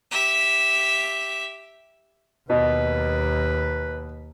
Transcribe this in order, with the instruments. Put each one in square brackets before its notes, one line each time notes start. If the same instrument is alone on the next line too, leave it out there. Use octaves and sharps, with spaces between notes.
[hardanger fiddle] G4 E5
[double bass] D#2 A#3 [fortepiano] B2 [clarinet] B4